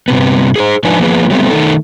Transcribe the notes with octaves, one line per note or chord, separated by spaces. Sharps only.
G2 C3 B3
G#4 A4 C5
G#2 F3 D4 D#4 B4 G#5
F3 A#3 B3 F4 G#4 B4
F#3 G3 A3 B3 C4
D#3 A3 D#4 A4